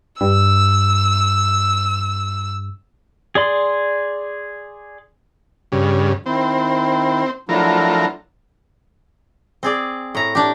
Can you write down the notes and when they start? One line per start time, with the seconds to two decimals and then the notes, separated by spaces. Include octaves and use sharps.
0.21 G2 E6
3.35 G#4 D5 C6
5.72 G2 C#3
6.26 D#3 C4 E4
7.49 F3 F#3 A3 D4 E4 A#4
9.63 C4 G#4 D5
10.15 A2 A#5
10.35 D4 G4